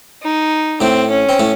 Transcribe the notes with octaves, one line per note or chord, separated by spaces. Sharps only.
D#4
A2 A3 C4
C#4
C4
A2 A3